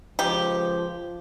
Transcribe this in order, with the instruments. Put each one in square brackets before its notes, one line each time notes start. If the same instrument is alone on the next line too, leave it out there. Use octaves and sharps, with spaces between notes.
[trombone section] C#2 F3 [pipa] G4